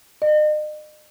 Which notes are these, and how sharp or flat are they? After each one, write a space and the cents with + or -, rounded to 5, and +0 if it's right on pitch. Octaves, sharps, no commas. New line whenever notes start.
D#5 -40